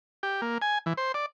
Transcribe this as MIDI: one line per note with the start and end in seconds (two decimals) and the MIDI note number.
0.23 0.41 67
0.42 0.58 58
0.62 0.78 80
0.86 0.93 52
0.97 1.12 72
1.14 1.26 74